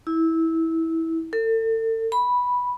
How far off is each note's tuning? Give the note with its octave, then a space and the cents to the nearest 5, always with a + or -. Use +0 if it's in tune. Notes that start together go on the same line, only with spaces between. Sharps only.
E4 -20
A4 +35
B5 -5